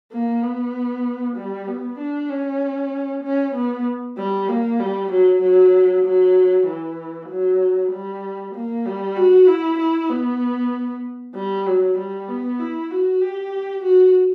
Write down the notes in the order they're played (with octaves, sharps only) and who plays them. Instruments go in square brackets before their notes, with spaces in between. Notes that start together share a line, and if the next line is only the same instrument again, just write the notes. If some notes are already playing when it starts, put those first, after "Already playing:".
[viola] A#3
B3
G3
B3
D4
C#4
C#4
B3
G3
A#3
G3
F#3
F#3
F#3
E3
F#3
G3
A#3
G3
F#4
E4
E4
B3
G3
F#3
G3
B3
E4
F#4
G4
F#4